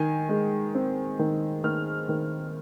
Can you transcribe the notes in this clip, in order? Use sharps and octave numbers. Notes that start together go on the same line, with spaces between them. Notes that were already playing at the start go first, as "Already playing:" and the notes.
Already playing: D#3 G#5
G#3
C4
D#3
D#3 F6
D#3